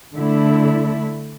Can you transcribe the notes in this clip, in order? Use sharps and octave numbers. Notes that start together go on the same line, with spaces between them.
D3 A3 E4